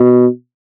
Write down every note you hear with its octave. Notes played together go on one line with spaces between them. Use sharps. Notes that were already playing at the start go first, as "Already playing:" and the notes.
Already playing: B2